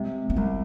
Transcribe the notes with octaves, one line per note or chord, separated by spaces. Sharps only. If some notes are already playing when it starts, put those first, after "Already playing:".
Already playing: C3 G#3
A#3
C2 G#3